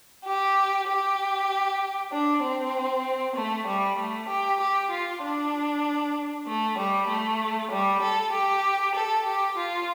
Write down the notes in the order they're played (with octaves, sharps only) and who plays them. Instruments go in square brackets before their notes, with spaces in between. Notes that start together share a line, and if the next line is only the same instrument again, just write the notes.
[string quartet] G4
G4
D4
C4
A3
G3
A3
G4
G4
F4
D4
A3
G3
A3
G3
A4
G4
A4
G4
F4